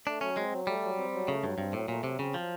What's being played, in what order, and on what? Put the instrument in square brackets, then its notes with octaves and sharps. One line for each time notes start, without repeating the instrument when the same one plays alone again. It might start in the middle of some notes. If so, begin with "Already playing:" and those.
[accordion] A3 [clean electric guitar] D4
[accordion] F#3 [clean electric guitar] C#4
[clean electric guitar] G#3 [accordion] C4
[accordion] F#3
[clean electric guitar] G3 [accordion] A3
[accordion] F#3
C4
F#3
[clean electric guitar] C#3 [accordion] A3
[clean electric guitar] G2 [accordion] F#3
[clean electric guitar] G2 [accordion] C4
[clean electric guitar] A2 [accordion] F#3
[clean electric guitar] A#2 [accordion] A3
[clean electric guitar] C3 [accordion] F#3
[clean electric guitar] C#3 [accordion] C4
[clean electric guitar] F3 [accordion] F#3